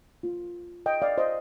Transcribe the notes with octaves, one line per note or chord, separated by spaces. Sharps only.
A#3 F4
D#5 G5
D5 F5
C5 D#5